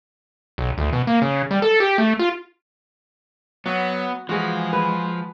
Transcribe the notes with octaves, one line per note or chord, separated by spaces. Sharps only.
B1
D2
B2
A#3
C#3
G3
A4
G4
A3
F4
F#3 B3 F#4
E3 F3 G#3 F#4 G#4 D#5
B4